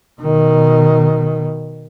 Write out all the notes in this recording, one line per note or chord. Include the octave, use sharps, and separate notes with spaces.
B2 D#3